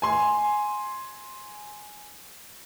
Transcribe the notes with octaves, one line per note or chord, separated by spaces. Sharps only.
G#5 C6